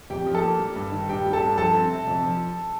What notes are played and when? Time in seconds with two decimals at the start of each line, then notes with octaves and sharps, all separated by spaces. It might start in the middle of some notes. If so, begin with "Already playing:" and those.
0.10 F2 G4 G5
0.26 F3
0.35 A4 A5
0.43 A#3
0.59 G3
0.76 G2
0.92 D#3
1.09 G2 G4 G5
1.25 G3
1.33 A4 A5
1.41 G2
1.57 F3 A4 A5
1.74 C4
1.90 C3
2.07 F2
2.23 F3